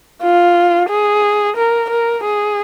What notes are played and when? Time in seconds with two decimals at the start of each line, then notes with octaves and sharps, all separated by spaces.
0.22 F4
0.89 G#4
1.56 A#4
1.90 A#4
2.23 G#4